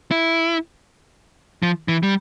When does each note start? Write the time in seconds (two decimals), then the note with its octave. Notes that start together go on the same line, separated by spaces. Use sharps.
0.11 E4
1.63 F3
1.88 E3
2.03 G3